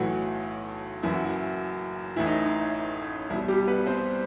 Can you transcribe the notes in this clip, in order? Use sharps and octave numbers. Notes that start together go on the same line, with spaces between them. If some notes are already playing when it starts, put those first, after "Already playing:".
Already playing: B1 A2 E3 F#3 F#4
F#1 F#2 E3 E4
F#4
E4
A1 A2 E3 E4
D#4
D#4
C2 B2 E4
G3 G4
B3 B4
C4 C5